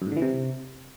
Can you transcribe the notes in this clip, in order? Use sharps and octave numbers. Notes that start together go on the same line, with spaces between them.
F#2
G#2
D3
E3
C3